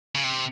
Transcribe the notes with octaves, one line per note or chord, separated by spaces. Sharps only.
C#3
C3